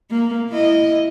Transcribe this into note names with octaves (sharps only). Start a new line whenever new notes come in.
A#3
E4 D#5